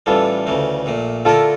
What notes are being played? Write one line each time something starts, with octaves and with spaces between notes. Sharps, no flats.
A1 A2 E3 G3 F4 A4
D2 C#3 E3 A3
A#1 A#2 A3
D3 A3 E4 F4 A4 A#4